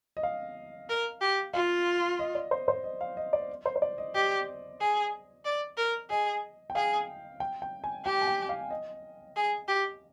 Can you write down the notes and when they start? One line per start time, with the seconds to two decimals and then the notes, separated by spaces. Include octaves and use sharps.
0.17 D#5
0.23 F5
0.89 A#4
1.21 G4
1.54 F4 F5
2.19 D#5
2.35 D5
2.51 C5
2.68 C5
2.84 D#5
3.01 F5
3.17 D#5
3.33 D5
3.66 C5
3.76 C5
3.82 D5
3.98 D#5
4.15 G4 D#5
4.80 G#4
5.45 D5
5.78 A#4
6.10 G#4 D#5
6.70 G5
6.75 G#4 F5
7.40 G5
7.62 G5
7.84 G#5
8.05 G4 G5
8.22 G#5
8.28 G5
8.49 F5
8.71 D#5
9.36 G#4
9.68 G4